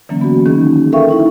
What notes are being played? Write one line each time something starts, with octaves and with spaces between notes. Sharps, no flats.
D3 E3 F#3 A#3 C#4
B3 F#4
D#3 C#4 D#4 G#4
A4 A#4 E5 F5 G5 C#6
D#4 E4 E5